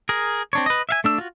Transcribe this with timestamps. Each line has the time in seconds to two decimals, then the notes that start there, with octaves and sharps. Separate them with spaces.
0.09 G#4 A#4
0.53 C4 D4 C#5
0.66 B4 D#5
0.89 E5 F5 G#5
1.04 A3 D4 E6
1.18 F4 F#4